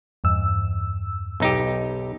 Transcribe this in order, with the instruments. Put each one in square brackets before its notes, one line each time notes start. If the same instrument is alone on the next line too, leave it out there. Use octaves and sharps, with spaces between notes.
[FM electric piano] E2 G2 E6
[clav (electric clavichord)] B1 D#4 G4